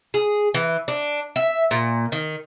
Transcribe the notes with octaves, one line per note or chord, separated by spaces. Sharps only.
G#4
E3
D4
E5
A#2
D#3